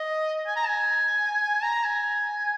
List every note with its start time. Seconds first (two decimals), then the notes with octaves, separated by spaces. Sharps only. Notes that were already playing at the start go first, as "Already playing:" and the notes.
Already playing: D#5
0.46 G#5
0.56 A#5
0.68 G#5
1.64 A#5
1.85 G#5